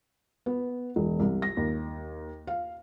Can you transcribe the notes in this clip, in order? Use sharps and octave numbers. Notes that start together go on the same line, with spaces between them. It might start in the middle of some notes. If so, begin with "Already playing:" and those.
B3
E1
C2
A#6
D#2
F5